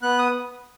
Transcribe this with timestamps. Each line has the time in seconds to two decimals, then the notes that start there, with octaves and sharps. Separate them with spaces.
0.03 B3 F#6
0.19 D#6